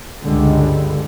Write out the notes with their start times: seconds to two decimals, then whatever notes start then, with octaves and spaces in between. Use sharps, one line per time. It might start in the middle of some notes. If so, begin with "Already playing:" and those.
0.24 C#2 G2 D3 G3 G#3